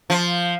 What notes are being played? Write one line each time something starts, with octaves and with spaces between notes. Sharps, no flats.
F3